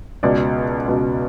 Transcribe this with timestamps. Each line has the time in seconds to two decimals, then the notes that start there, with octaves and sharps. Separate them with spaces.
0.23 C#2 B2 D5
0.87 C#2 B2